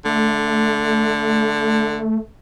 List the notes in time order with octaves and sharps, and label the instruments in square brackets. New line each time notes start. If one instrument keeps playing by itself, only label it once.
[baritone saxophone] D3 [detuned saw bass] A3